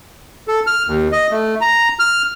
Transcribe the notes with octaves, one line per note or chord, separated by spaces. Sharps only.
A4
F6
D#2
D#5
A3
A#5
F6